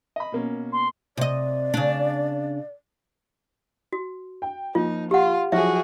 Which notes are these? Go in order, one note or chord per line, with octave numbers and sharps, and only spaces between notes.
D#5 B5
B2 A#3 C#4
C6
C3 D5 D#5
C#3 D4
F#4
G5
F3 A#3 D#4 F4
F4 G4 F#5
F3 F#3 E4 F#4 G#4 E5